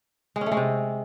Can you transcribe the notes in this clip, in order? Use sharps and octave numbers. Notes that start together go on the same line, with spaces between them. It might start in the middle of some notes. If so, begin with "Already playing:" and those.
G#3
C#4
A3
G#3
C3